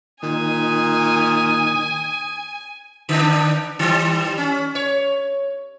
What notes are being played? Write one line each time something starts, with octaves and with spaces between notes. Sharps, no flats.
A#2 D#3 G#5 D#6
D3 D4
D#3 G3
C#4
C#5